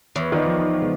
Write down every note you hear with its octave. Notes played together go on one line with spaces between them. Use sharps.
E2 B4 C#5 E5
D#3 F4 D5 D#5
F3
C#3 G#3 B3